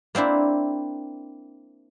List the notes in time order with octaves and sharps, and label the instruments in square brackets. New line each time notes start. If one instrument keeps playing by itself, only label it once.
[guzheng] A#3 C4 D4 E4